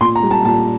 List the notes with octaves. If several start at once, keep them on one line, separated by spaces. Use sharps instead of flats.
A#2 C6
A#5
G3
A5
A#2 A5